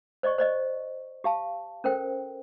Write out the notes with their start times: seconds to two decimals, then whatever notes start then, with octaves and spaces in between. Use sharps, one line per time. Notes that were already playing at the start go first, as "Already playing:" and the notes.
0.23 C5 D5 D#5 C#6
0.38 C5 D5 D#5
1.24 G4 F5 A5
1.84 C#4 A4 A#4 C5 G5